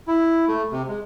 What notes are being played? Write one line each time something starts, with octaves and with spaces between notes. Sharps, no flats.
E4
A3
C3
G#3